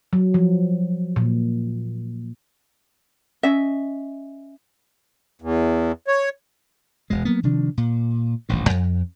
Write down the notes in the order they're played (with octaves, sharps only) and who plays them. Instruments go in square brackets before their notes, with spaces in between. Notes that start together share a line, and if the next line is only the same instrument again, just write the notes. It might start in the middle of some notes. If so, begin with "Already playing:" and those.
[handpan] F#3
F3
A#2
[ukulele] C#4 D#5 E5
[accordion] E2
C#5
[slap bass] E1 B2 G#3
F#3 A#3 B3
C3 D#3 F3 D4
A#2
D#1 A1 G2
F2